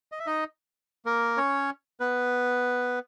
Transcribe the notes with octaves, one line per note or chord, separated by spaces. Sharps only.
D#5
E5
D#4 D#5
A#3 A#4
C#4 C#5
B3 B4